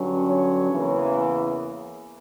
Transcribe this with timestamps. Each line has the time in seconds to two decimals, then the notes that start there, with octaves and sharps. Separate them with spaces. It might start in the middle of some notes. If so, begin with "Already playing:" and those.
Already playing: G2 D3 F#3 C#4
0.23 C#5
0.70 E2 C#3 E3 A#3